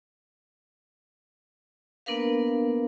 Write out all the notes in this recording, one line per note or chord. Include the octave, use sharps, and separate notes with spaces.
A#3 B3 D4 A#4 B4 F5